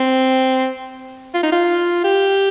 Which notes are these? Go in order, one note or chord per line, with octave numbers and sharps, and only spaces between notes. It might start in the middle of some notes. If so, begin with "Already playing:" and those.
Already playing: C4
F4
D#4
F4
G4